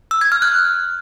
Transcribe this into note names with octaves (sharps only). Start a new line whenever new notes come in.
E6
G#6
F6
F#6